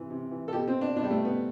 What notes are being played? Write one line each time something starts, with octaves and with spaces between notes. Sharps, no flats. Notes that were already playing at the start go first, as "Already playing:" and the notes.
Already playing: C3 E3
C3
E3
A4
B2 G4
C4
D4
B2 D4
G3
A3
B3